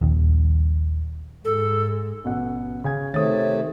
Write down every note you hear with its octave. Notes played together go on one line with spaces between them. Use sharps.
D#1 A#1 D#2
G#2 G#3 A4
A1 B2 F#5
C#3 G#5 G#6
C3 D#3 A3 C#5 D#6 A6